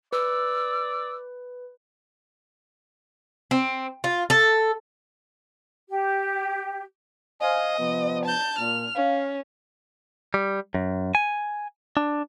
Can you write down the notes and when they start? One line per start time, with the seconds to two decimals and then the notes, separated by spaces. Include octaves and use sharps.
0.13 B4 D5 E6
3.51 C4
4.04 F4
4.30 A4
5.89 G4
7.41 C5 D#5 F5 G#5
7.79 C3 F3 B3
8.25 A5 G6
8.59 A#2 F6
8.95 C#4 F5
10.34 G3
10.74 F#2
11.15 G#5
11.97 D4